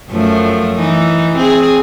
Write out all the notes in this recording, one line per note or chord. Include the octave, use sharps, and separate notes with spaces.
F#2 F3 A3
E3 D#4
C4 G#4